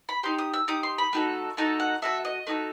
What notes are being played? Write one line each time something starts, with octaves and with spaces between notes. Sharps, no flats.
B5
D#4 G4 C6
D#6
E6
D#4 G4 D#6
C6
B5
A3 D#4 F#4 A4
A3 D#4 F#4 A4 A5
F#5
A3 D#4 F#4 A4 E5
D#5
A3 D#4 F#4 A4